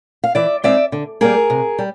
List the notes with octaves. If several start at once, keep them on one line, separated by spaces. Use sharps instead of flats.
F5
E3 D5 E5
G#3 C4 D#4 D5 E5
D3
G3 A#3 G#4 A#4
C3
G3